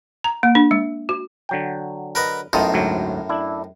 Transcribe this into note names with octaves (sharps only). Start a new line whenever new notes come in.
A#5
A#3
D4
G#3
F#4
D3 F#3 G5
A#4 B4 D#5
F#2 A2 B3 D#4 F4
D2 G#2 F#3
D4 E4